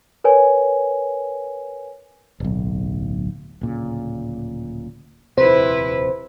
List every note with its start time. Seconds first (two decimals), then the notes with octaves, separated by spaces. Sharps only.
0.24 A#4 B4 C#5 G#5
2.40 D1 B1
3.61 D1 A#2 C#3
5.38 D#1 F2 C3 E4 B4 C5